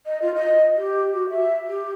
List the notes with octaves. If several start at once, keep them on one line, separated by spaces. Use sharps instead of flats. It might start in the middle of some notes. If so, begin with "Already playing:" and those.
D#5
F4
D#5
G4
F#4
E5
G4